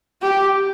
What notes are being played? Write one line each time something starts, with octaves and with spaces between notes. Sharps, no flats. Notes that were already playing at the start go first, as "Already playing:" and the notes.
G4